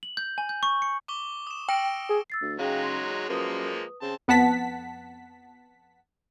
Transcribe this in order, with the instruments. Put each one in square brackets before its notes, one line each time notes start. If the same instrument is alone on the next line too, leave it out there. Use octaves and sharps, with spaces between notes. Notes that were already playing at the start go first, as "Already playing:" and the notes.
[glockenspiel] F#7
G6
G#5
G6
C#6
C#7
[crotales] C#6 D6 G7
D#6 E7
[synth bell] G5 [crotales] E6 A#6 D7
[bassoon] G#4
[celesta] E6 A6 C7
[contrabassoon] D2
[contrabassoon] C#3 [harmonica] F#3 G#3 D#4 [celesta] F5 G5
[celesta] C6
[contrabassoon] F#2 [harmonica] F3 G#3 A#3 [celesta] B4 D#6
[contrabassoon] C#3 [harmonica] C4 A5
[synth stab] F2 B3 F#5 A5 B6